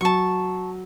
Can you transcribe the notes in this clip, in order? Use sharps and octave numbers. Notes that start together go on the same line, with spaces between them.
F#3 A5 C#6